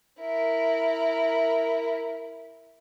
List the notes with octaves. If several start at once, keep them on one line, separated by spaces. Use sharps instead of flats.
E4 A#4